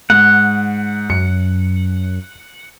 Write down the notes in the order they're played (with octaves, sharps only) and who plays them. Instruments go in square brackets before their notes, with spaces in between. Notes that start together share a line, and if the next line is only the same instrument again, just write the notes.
[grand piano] G#2 [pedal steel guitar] F#5
[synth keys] F#2 [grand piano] C#7